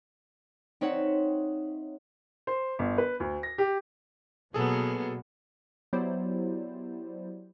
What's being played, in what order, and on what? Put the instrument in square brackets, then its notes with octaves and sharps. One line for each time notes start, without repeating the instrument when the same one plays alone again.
[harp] C4 D#4 C#5 E5 F#5
[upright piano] C5
G1
B4
D2
A#6
G4
[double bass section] B2 [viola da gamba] F#3 A#3 B3 [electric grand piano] G#4 A4
[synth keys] F#3 B3 E4 G4 C5 D5